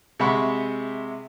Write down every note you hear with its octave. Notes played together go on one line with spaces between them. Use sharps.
C3 G#3 E5 F#5 B5 C#6